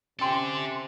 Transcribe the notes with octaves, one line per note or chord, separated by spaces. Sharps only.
C3 C#4 G4 A4 D5 G5 G#5 C6